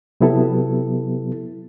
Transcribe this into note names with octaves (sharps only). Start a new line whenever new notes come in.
C3 F#3 B3 E4 G4 A4